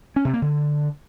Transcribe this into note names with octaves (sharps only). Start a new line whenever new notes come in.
C#4
C3
A#3
D3